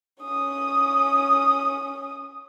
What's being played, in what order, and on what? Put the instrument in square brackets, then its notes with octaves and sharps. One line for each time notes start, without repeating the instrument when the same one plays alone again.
[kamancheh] C#4 D#6